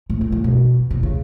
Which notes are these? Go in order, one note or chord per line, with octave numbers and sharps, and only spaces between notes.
A2
A2
A2
B2
C3
C#3